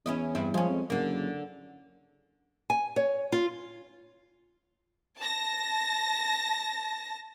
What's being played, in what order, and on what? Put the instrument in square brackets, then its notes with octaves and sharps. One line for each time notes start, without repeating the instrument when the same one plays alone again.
[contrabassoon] E2 [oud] C#4 E4 D#5
[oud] G2 C4 E4
[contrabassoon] F3 [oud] G#3 C#4
[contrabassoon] F2
[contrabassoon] F#1 [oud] D3 A#3
[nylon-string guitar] G#5
C#5
F4
[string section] A5 A#6